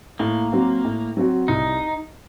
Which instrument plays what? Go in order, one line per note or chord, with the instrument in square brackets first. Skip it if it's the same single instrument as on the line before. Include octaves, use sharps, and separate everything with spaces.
[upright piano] A2 [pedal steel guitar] A#3
[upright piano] F#3 C4 F#4
A2
F#3 C4 F#4
[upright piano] C2 [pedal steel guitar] D#4